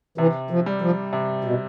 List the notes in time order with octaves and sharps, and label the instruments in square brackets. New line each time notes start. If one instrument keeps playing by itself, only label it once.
[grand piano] C3 [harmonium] E3
[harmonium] F3
[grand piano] G3
[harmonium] F3
[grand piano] C3
[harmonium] B2